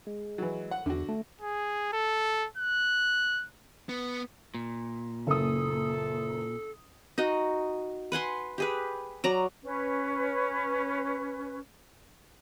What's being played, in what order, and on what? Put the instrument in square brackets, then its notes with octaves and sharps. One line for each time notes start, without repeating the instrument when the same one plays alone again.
[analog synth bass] G#3
[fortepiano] E3 F#3
F#5
[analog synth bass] E2 [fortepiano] D3 F#4
[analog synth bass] A3
[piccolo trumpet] G#4
A4
F#6
[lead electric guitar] B3
[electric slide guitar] A#2
[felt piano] F#1 D#6 [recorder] A4
[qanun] D#4 F#4 D#5
B4 F#5 G#5 C6
G4 G#4 B4
F#3 D5 A#5
[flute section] C#4 B4